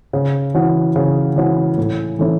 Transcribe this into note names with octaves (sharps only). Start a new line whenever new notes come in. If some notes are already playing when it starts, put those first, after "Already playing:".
C#3
E3 C#4 F#4
C#3
E3 C#4 F#4
A2
E3 A3 C#4 E4